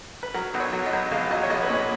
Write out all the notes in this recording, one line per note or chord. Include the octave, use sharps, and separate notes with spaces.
B4
F#3 A#4
B1
C#5
F#3
D#5
B1
A#1 F5
F#3 D#5
C#5
A#1 D#5
B4
A#2 C#5